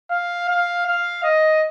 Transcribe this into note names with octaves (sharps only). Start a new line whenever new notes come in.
F5
F5
F5
D#5